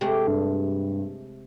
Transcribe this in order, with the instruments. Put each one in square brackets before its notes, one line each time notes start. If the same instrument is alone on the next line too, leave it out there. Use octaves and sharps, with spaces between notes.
[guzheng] C3 G#3 A3 [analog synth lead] G4
[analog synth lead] G2